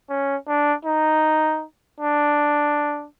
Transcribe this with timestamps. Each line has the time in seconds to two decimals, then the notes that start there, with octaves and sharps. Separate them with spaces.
0.09 C#4
0.47 D4
0.85 D#4
2.00 D4